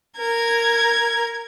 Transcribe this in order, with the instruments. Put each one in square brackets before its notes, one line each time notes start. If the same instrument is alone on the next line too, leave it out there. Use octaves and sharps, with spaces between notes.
[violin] A#4 G#6